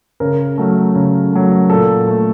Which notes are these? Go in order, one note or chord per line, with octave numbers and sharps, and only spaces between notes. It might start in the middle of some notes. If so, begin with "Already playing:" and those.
C#3 A#4
F#3 A3
C#3
F#3 A3
A#2 A4
A3